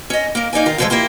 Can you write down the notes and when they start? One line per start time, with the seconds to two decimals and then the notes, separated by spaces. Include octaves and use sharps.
0.10 C#4 D#5
0.35 A#3 A#4
0.53 A#3 D#4 D5 G#5
0.66 D#3 F4 A#4
0.78 A#2 C#3 F3 F#3 G#3 A3
0.90 A#3 E4 F4 G4